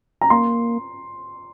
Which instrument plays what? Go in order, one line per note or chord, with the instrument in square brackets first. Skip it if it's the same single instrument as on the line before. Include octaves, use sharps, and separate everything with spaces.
[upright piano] A#5
[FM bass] A#3 [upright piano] C6